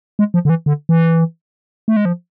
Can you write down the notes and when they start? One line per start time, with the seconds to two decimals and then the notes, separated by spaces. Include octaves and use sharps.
0.19 G#3
0.34 F3
0.45 D3
0.50 E3
0.66 D3
0.89 E3
1.88 A3
1.97 G#3
2.05 F3